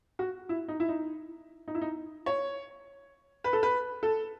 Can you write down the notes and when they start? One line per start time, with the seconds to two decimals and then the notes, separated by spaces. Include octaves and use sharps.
0.19 F#4
0.49 E4
0.68 D#4
0.80 E4
0.89 D#4
1.68 D#4
1.75 E4
1.82 D#4
2.26 C#5
3.44 B4
3.53 A4
3.63 B4
4.03 A4